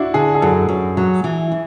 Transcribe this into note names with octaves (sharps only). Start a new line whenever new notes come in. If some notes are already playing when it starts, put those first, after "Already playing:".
Already playing: D4 E4 F#4
D3 G#4
G#4
F#2 A4
F#2
F#3
E3
E4